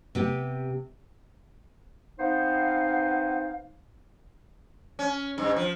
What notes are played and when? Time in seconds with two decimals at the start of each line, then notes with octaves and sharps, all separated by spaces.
0.15 C3 B3 G4
2.20 B3 C4 D#4 C5 F5
4.99 C#4
5.38 G2
5.56 F3